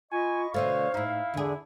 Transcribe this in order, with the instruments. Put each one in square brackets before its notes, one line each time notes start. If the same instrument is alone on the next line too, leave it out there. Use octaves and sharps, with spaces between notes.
[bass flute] F4 [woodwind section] D#5 B5 C#6 [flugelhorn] G#5
[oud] B2 D3 A3 [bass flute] C5 [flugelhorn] C#5 [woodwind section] F5
[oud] A2 D#4 [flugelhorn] E4
[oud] E2 G#4 [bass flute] D3